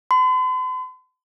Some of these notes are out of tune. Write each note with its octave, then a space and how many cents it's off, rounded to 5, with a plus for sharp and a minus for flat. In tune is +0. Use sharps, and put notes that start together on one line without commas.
C6 -45